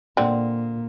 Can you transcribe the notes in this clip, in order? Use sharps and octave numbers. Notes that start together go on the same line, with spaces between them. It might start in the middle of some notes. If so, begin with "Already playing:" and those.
A#2 D3 C4